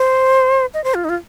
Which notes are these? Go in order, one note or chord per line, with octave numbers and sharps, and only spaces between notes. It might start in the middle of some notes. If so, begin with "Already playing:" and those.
Already playing: C5
D#5
C5
F4
D#4
F4